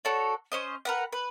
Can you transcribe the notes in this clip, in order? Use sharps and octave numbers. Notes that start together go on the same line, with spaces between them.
F#4 A4 C#5 D5
C#4 C5 D#5
A#4 B4 F#5
B4